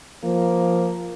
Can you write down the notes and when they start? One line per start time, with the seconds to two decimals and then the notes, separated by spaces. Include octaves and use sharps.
0.24 F3 A#3